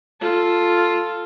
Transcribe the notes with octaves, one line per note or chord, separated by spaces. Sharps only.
F4 A4